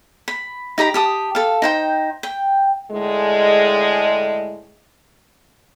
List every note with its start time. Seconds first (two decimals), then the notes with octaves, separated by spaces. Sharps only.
0.28 B5
0.78 D#4 G4 A#5 B5
0.94 G4 A5 D#6
1.35 A4 F5
1.62 D#4 C5 G5
2.23 G5
2.91 A2 D3 G#3